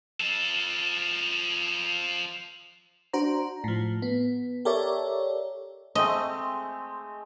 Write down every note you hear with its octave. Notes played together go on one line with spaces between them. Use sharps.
F3 A4
D4 F#4 C5 A#5
A2 F3
B3
G4 A4 A#4 C#5 D5 E5
G#3 A3 C4 D#5